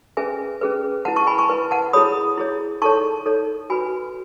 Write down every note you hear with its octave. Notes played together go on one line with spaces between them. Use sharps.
C#4 G#4 B4 E5 G#5
C#4 G#4 B4
E4 B4 F#5 A5
A5 C#6
G#5 B5
A5 C#6
E4 B4
F#5 A5
E4 G#4 C#5 B5 D#6
E4 G#4 C#5
D#4 A4 C#5 A5 C#6
D#4 A4 C#5
F#4 B4 G#5 B5